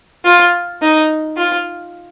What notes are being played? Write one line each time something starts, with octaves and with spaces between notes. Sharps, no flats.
F4
D#4
F4